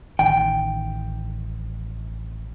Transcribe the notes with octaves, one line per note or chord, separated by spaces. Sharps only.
A1 D#3 G5